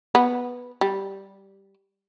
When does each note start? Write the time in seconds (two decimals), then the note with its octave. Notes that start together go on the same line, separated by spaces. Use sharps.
0.15 B3
0.81 G3